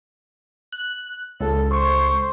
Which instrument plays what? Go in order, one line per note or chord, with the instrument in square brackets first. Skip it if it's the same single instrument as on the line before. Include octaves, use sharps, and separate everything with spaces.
[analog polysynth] F#6
[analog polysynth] C#2 [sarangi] A4
[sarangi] C5 [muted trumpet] C#6